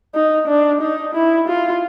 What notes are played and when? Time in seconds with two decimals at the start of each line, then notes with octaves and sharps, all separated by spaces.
0.14 D#4
0.48 D4
0.81 D#4
1.15 E4
1.48 F4